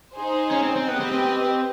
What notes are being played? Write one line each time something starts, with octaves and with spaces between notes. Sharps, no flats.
D#4 G#4 C5
C#4
C4
C4
B3 G4 B4 D#5
C4
C4